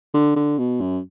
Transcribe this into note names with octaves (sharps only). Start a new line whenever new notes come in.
D3
D3
B2
F#2